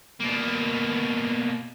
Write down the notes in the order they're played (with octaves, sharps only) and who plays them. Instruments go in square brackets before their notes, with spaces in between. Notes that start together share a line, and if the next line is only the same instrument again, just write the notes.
[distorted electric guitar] B2 A#3